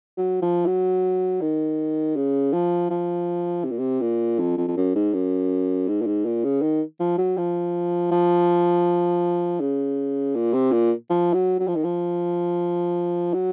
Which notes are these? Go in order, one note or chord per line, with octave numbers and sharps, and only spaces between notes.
F#3
F3
F#3
D#3
C#3
F3
F3
C3
A#2
C3
A#2
F2
F2
F2
F#2
G#2
F#2
G#2
A#2
G#2
A#2
C#3
D#3
F3
F#3
F3
F3
C#3
A#2
C3
A#2
F3
F#3
F#3
F3
D#3
F3
F#3